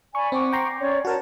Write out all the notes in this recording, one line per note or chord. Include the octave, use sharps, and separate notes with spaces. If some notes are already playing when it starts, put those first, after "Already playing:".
D5 G#5 B5 C#6
C4 F#5 C#6 D6
G5 A#5 C6
C#4 C#5 D5
F#4 A#4 C#5 A5 A#5